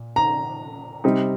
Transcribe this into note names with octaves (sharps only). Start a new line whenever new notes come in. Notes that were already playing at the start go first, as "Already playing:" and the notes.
Already playing: A#2
A#5
C3 G3 C4 D#4